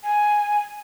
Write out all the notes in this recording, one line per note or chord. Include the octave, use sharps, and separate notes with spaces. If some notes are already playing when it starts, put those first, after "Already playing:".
G#5